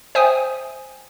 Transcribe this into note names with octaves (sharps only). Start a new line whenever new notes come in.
C5 E5 G5 G#5 D#6